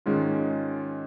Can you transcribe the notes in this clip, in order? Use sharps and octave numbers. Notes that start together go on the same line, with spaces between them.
G#2 D#3 G#3 C#4 F4